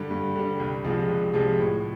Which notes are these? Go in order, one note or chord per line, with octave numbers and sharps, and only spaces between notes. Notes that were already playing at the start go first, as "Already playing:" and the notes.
Already playing: G2 D3 G3
G2
D3 G3
C2
C3 F3 G#3
C2
C3 F3 G#3
A2